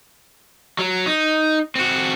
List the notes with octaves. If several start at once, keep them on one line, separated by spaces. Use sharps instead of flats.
F#3
D#4
C4 F#4